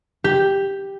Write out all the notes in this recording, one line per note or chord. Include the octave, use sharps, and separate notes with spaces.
G4